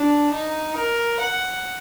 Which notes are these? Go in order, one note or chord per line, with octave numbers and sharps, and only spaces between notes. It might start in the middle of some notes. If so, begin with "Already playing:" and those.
Already playing: D4
D#4
A#4
F#5